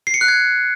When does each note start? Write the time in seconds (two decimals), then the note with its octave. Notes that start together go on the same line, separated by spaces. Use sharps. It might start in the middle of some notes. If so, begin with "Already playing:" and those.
0.07 C7
0.14 C#7
0.21 F#6
0.28 G#6